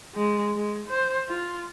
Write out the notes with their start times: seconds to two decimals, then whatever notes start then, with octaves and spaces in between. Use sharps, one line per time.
0.15 G#3
0.56 G#3
0.88 C5
1.29 F4